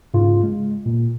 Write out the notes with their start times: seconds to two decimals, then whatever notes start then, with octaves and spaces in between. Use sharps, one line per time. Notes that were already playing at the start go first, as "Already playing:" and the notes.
0.14 G#2 C#3 F4
0.43 G#3
0.86 A#2